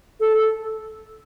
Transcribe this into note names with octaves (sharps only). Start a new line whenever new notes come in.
A4